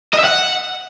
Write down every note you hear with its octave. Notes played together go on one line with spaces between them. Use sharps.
D#5
E5
F#5